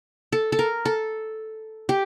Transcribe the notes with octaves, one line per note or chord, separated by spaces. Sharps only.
A4
A4
A#4
A4
G4